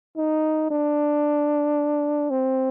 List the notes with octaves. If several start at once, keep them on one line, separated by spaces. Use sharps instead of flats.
D#4
D4
C4